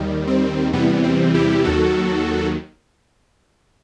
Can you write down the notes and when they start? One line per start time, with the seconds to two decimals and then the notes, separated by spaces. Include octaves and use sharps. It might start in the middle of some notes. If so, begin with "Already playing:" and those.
Already playing: D#2 D#3 G3
0.27 C4
0.73 E2 C3 E3 G3 B3
1.04 C4
1.34 E4 G4
1.64 D#2 D#3 F#3 F#4 A4